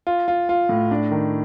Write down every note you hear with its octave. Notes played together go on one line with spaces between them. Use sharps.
F4
F4
F4
A2
D4
D#3